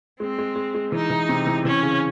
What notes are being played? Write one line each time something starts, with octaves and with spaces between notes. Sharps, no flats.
G#3 C4
G#3
G#3
G#3
E3 D#4
E3
C3
E3
E3 C#4
C#3